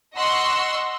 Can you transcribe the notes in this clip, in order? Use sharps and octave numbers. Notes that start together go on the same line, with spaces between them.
D#5 F#5 C6 C#6 E6